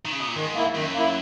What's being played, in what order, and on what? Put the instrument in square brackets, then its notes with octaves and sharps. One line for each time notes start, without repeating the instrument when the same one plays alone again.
[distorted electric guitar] D#3
C#3
B2
A#2
[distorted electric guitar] G#2 [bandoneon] D#3
[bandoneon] A#3 E4
[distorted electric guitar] F#2 [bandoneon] D#3
[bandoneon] A#3 E4